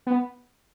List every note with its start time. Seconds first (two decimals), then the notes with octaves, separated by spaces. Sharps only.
0.07 B3